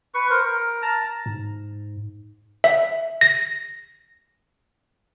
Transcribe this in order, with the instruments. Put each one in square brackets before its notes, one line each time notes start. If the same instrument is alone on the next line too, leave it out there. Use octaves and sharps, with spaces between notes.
[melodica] B4 C#6
A#4 C5
A#4
A5 A#5
[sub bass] G#2
[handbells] E5
A#6